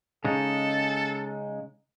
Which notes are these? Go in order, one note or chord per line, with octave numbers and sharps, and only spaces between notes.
C#3 G#3 D#4 A4